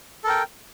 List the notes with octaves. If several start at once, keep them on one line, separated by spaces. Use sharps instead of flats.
A4 A#4 G5